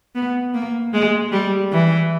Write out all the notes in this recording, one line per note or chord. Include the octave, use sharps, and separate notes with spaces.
B3
A#3
G#3
G3
E3